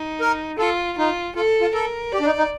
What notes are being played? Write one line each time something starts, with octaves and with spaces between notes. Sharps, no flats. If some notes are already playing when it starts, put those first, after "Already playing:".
Already playing: D#4
A#4
F4 A4
D#4 F4
F4 A4
F4
A4 A#4
G4 D5
D4
D#4
D#4